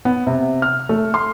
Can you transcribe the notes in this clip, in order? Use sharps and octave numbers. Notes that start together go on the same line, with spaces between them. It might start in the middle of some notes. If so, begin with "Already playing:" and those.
B3
C3
F6
A3
C6